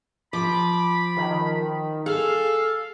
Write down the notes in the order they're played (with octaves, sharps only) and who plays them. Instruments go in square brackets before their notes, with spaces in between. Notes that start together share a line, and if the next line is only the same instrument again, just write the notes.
[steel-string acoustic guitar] F3 [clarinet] B5 [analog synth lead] D6
[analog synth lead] D#3
[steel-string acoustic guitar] G#4 [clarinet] A4 [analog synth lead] F5